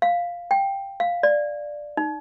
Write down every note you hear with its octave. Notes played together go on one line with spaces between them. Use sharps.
F5
G5
F5
D5
D#4